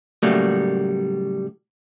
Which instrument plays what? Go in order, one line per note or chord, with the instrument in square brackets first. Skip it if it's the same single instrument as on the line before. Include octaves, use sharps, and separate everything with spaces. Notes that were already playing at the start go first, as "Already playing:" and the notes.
[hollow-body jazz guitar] A2 C#3 F#3 G3 A3 A#3